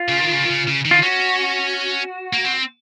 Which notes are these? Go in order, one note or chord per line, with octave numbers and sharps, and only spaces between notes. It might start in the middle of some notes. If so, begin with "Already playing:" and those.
Already playing: F4
C#3
D#3
C#3
D#3
C#3
C#3
D#3
F4
C#4 F#4
A#3
C4